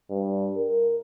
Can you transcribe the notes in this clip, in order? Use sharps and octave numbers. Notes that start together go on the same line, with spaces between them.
G2
A#4